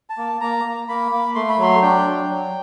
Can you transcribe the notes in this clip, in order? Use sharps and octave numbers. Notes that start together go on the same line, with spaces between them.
A5
A#3
A#3 A#5
A#3
A#3 B5
A#3
A3 C6
B5
F#3 C6
D4 G5
F#3
F#3